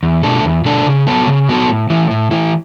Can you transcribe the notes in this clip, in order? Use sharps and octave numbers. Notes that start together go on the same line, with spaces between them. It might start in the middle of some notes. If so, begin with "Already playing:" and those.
E2
B2 A3 D4 A4
E2
B2 A3 D4 A4
C#3
F#3 B3 F#4 A4
C#3
F#3 B3 F#4 A4
A2
E3 A3 E4
A2
E3 A3 E4